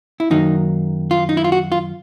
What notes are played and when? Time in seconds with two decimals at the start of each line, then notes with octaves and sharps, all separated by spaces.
0.20 E4
0.30 F#2 D#3 F#3 A#3 D#4
1.11 F4
1.29 D#4
1.37 E4
1.44 F4
1.52 F#4
1.72 F4